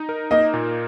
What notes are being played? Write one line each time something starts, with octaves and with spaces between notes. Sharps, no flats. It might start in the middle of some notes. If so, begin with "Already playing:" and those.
Already playing: D#4
A#4
A#3 D#5
A#2